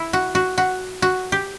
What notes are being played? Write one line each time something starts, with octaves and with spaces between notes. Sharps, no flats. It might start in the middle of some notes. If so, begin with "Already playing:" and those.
Already playing: E4
F#4
F#4
F#4
F#4
G4